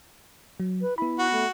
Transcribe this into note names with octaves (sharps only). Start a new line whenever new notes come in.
F#3
B4
B3 E4 B5
F#4
A3